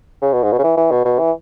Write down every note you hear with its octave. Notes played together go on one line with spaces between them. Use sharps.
C#3
B2
G#2
B2
C#3
E3
E3
B2
B2
E3